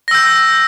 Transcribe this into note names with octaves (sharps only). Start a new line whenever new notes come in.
E6 G6 A#6